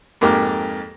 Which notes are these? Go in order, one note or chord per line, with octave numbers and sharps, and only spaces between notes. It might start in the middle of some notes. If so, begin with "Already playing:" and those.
F2 G#2 A#3 G4 D6